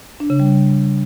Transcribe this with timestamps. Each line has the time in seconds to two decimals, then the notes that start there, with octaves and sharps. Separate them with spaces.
0.20 D4
0.30 C#3
0.40 G3